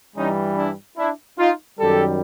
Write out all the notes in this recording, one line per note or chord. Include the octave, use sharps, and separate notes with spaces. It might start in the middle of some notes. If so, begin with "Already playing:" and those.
G2 E3 G3 C#4 D#4
D4 E4
D4 E4
D#4 F4
F#2 D#3 G3 G4 A4